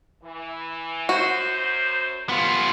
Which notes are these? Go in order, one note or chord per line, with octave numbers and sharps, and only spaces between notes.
E3
F#2 F#4 C5
B3 F4